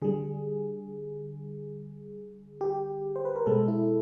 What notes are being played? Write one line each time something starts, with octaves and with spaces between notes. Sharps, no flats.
D3 G3 G#4
G4
C5
B4
A#4
B2 G#3 A4
E4